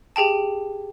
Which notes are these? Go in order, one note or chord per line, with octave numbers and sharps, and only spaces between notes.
G4 G#4 G5 A5